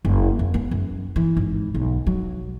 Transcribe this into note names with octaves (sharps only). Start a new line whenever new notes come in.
F#1
F2
B3
F#2
E3
G#1
B1
F#3